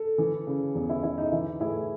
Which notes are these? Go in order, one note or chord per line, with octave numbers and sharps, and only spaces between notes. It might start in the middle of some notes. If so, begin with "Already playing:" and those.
Already playing: A4
E3
C#3
E2
E4
E3 E4
D#4
E3 E4
A2 E4 G#4